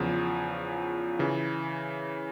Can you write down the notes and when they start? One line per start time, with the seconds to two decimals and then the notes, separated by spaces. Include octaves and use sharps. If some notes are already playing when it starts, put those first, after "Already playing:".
Already playing: E2 C#3 F3
1.19 C#3 E3